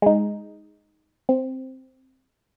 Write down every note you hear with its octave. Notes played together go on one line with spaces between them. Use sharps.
G#3 D#4
C4